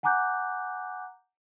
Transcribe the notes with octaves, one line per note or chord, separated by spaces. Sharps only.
F#5 G#5 A#5 D6 F#6 G6